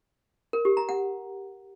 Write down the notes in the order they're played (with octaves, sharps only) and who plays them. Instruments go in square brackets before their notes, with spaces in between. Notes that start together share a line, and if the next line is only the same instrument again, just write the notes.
[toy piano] A#4
G4
A#5
F#5